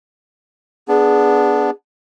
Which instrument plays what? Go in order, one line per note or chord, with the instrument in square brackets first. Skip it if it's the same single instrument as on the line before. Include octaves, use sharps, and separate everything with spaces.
[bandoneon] B3 D4 [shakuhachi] G#4